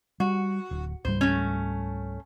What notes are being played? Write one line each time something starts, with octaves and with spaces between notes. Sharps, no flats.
G3 F#4
D1
C#2 G#2 G3 C5
A3 C#4